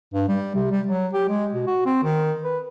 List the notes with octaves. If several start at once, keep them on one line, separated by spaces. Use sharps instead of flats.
G2
G3
C3
G3
F#3
G4
G#3
B2
F#4
C4
D#3
B4